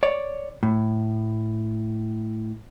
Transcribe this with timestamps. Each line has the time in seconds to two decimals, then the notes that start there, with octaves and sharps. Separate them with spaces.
0.03 C#5 D5
0.63 A2